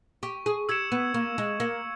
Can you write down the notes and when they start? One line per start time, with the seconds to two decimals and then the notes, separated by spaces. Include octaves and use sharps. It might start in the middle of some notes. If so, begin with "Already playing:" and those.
0.23 G4 C#6
0.46 G#4
0.69 G4 E6 G#6 C#7 E7
0.92 B3
1.14 A#3 C#6
1.38 G#3
1.60 A#3 E6 G#6 C#7 E7